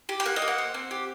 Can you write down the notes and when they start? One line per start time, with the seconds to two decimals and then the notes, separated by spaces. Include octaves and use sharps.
0.09 G4
0.20 G5
0.25 A#3 F#5
0.36 D#5
0.42 A#3
0.48 F#5
0.58 C4
0.74 C4
0.91 G4